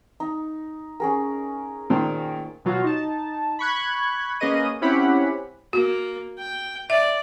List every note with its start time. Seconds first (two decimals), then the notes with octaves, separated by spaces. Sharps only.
0.20 D#4
1.00 C#4 G#4 A#4
1.90 A#2 D#3 C5
2.65 B2 F#3 F4 F#4
2.84 D#4 A5
3.59 B5 C#6 F#6 G#6
4.40 A#3 C#4 G#4 B4 D#5 D#7
4.81 C4 C#4 E4 G4 F#5 B5
5.73 A#3 F#4
6.38 G5
6.90 D5 E5